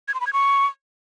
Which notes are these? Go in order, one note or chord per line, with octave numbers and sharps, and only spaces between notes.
G#6
C6
B5
G#6
C#6